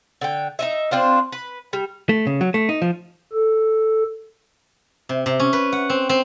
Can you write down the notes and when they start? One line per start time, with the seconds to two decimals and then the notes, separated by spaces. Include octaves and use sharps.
0.21 D3 G5
0.59 D#4 D#5 E5
0.91 C4 D4 F4 C5
1.32 B4
1.73 G3
2.09 A3
2.27 C#3
2.41 F#3
2.54 A3
2.69 D#4
2.82 F3
3.33 A4
5.09 C3
5.26 C3
5.40 C#4
5.53 B4
5.72 F#5
5.90 C4
6.09 C4